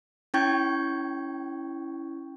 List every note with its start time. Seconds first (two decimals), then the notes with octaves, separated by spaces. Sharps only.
0.34 C#4 E4 G5 C#6 G6 G#6